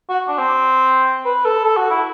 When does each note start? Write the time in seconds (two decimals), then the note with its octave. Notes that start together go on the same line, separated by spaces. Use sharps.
0.09 F#4
0.28 D4
0.38 C4
1.25 B4
1.45 A4
1.64 A4
1.77 F#4
1.90 E4